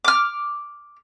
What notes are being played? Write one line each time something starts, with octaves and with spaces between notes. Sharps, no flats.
D6 F6